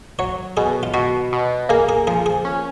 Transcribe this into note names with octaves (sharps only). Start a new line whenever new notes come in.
F#3 C#5
B2 G#4
F4
B2 F#4
B2
A#3 G#4
G#4
F3 G#4
G#4
C#4